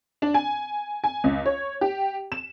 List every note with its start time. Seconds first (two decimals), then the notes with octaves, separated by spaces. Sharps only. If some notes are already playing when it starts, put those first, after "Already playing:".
0.22 D4
0.34 G#5
1.04 G#5
1.24 C#2
1.46 C#5
1.81 G4
2.32 E7